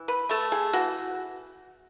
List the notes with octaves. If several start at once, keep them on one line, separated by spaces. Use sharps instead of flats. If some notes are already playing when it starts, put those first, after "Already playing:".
Already playing: E3
B4
A3 A4
G#4
E3 F#4